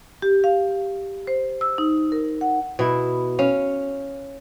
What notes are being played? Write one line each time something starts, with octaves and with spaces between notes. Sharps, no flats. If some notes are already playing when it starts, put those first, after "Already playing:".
G4
F5
C5
E6
D#4
A#4
F#5
B2 E4
C#4 F5